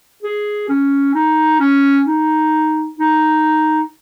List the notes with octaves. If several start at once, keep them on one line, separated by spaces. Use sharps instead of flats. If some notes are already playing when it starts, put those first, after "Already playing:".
G#4
C#4
D#4
C#4
D#4
D#4